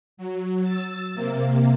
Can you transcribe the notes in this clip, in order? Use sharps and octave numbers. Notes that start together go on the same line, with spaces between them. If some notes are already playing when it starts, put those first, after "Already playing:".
F#3
E6 A6
C3 A#3